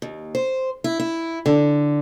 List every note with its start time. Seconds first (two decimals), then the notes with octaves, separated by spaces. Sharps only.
0.02 D#2
0.35 C5
0.84 E4
1.00 E4
1.46 D3